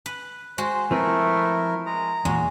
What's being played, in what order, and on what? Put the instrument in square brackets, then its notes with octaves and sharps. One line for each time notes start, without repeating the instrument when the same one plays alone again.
[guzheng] B4
[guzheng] G#3 F#4 [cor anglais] C5
[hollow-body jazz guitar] F3 C4 B4 [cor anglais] A3 [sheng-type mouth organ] E4 A#4
[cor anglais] G#3 [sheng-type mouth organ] A#5
[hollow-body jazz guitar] E2 A#2 [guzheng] G#3 [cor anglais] F#4